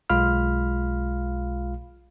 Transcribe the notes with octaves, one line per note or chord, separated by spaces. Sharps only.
B1 G#3 F4 F5 B5 F6